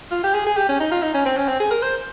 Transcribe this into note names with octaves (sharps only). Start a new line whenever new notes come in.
F4
G4
G#4
G#4
G4
C#4
D#4
F4
D#4
C#4
C4
C#4
C4
G#4
A#4
C5